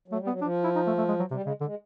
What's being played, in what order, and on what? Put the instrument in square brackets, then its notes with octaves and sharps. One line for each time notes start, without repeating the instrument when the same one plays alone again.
[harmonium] F#3 [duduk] A3
[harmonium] G3
[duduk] B3
[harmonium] F#3
[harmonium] F3 [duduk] D4
[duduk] E4
D#4
A3
A3
G#3
F#3
[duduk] C3 [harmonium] G3
[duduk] C#3 [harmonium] G#3
[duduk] D3
[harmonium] G#3